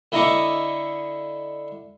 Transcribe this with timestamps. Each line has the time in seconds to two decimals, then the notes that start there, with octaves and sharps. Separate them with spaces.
0.12 D3 E4 D#5 A#5 C#6 D6